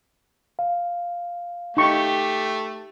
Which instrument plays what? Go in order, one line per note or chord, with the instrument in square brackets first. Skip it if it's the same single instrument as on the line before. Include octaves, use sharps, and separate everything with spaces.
[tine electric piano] F5
[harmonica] A3 [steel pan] D#4 C#6 [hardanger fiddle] G4